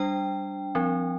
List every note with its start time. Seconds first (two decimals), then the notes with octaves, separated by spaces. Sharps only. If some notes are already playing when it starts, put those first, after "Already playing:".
Already playing: G3 D4 G5
0.75 F3 C4